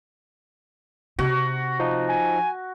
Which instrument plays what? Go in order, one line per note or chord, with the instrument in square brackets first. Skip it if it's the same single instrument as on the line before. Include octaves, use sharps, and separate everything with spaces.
[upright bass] C3 [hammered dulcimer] F#4
[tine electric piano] F3 D#4
[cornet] G#5